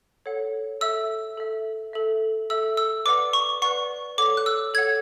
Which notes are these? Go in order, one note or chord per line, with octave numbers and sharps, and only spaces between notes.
A4 C#5 F#5
A4 E5 E6
A4 E5
A4 E5
A4 E5 E6
E6
B4 D5 F#5 D6
C#6
B4 D5 F#5 C#6
A4 C#5 F#5 D6
F#6
E6
A4 C#5 F#5 G#6